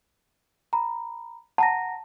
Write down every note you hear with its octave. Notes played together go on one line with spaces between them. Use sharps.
A#5 B5
F#5 A5 A#5 A#6